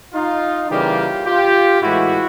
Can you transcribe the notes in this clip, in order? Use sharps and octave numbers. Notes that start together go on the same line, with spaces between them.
D#4 F4
C#3 E3 G3 A#3 F4 G4
F4 G4
A2 E3 G#3 E4 F#4